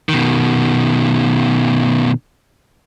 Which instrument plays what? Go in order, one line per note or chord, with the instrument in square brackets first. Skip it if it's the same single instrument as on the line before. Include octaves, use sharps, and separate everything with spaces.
[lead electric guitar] B2 D#3